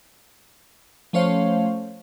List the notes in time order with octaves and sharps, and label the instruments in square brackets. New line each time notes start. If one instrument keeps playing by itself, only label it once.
[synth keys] F3 A3 C#4 C5 C#5 F5